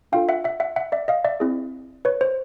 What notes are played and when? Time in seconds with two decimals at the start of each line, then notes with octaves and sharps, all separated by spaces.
0.12 D4 F4 A4 F5 G5
0.29 E5 F#5
0.44 E5 F#5
0.60 E5 F#5
0.76 E5 F#5
0.92 D5 E5
1.08 D#5 F5
1.24 D5 E5
1.40 C4 E4 G#4
2.05 B4 C#5
2.21 C5